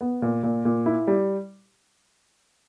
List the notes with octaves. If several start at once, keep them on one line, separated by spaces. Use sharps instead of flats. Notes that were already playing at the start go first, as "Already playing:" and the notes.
B3
A#2
A#2
A#2
E4
G3